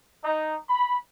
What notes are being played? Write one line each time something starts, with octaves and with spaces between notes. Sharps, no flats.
D#4
B5